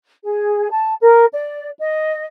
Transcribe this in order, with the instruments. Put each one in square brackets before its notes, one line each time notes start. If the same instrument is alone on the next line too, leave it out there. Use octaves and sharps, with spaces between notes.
[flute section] G#4
A5
A#4
D5
D#5